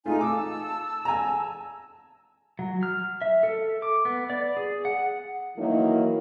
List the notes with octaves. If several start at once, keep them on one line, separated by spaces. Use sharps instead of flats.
A3 D#4 F4 G#4 G#5
A5 D6 E6
G#5 A#5
F#3
F6
E5
A4
D6
B3
D5
G#4
F#5
D#3 E3 F#3 A#3 E4